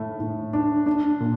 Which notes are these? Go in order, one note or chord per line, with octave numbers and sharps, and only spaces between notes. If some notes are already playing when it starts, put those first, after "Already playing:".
Already playing: A2 A3
A2
D4
D4
A#2